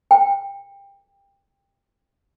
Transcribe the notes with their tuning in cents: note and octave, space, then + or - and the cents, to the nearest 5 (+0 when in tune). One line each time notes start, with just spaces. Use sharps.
G5 +20